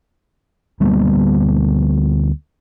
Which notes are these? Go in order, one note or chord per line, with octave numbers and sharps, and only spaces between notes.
D2 G3 A#3 B3